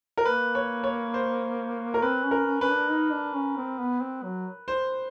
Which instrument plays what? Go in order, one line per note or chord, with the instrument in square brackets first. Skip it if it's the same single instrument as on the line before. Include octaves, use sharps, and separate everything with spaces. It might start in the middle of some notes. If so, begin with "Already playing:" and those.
[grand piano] A#4
[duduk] A#3 [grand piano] B4
[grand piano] C#5
C#5
C5
A#4
[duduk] C4 [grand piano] B4
[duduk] C#4
[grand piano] A#4
[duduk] C#4
[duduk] C#4 [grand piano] B4
[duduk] D4
D#4
D4
C#4
C4
B3
C4
F#3
[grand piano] C5